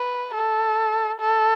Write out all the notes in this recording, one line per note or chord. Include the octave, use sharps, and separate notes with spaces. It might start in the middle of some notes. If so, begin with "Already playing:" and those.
Already playing: B4
A4
A4